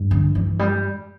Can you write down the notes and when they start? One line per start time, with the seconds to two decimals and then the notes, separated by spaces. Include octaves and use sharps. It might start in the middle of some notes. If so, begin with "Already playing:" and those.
Already playing: G2
0.11 D3
0.35 E3
0.59 G3